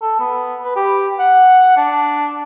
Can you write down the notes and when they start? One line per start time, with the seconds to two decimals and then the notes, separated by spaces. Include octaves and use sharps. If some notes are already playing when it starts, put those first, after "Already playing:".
0.02 A4
0.20 B3
0.63 B4
0.76 G4
1.19 F#5
1.77 D4